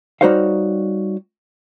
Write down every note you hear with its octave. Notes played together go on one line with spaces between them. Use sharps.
G3 D#4 F#4 C5 C#5 F5